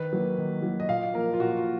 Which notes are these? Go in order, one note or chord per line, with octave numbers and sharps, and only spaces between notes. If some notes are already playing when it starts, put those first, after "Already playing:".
Already playing: D#3 B4
F#3 A#3
D#3
F#3 A#3
D#5
A#2 F5
F3 A#3 A#4
F4
A#2 F#4
F4